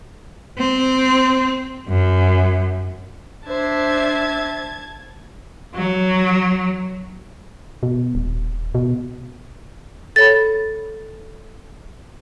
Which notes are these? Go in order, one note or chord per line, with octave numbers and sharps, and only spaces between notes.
C4
F#2
D4 C5 E5 A5 G#6
F#3
B2
D#1
B2
A4 C#5 B5 A6